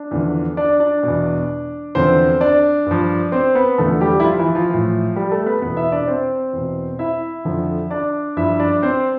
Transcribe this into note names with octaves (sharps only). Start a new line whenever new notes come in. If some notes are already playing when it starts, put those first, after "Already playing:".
Already playing: D4
E2 D3 F3
D4 D5
D4 D5
E2 B2
E2 D3 F3 C4 C5
D4 D5
G2 F3
C4 C5
B3 B4
E2 D3 F3 A3 A4
G3 G4
E4
F3 F4
E3 E4
F3 F4
A2 E3
G3 G4
A3 A4
B3 B4
E2 B2 B3 B4
E4 E5
D4 D5
C4 C5
E2 B2
E4 E5
F2 D3 F3
D4 D5
G2 F3 E4 E5
D4 D5
C4 C5